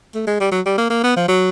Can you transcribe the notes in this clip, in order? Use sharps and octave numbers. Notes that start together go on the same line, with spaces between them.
A3
G#3
G3
F#3
G3
A#3
A#3
B3
F3
F#3